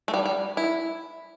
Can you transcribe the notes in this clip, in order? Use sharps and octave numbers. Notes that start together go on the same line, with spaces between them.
A3
G3
G3
E4